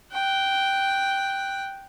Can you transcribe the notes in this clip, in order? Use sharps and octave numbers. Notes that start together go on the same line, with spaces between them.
G5 F#6